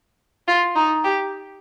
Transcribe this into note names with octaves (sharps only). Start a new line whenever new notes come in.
F4
D#4
G4